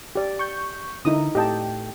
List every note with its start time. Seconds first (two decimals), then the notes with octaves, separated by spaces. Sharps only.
0.15 G4 D5
0.39 C#6 G6
1.05 D3 D#4 E4 D#6
1.35 A2 A3 G4 D#5 G5 A5